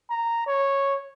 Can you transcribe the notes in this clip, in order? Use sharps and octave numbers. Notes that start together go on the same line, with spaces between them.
A#5
C#5